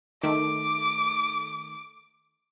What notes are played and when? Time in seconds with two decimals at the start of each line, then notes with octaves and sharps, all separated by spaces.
0.23 D#3 A3 D6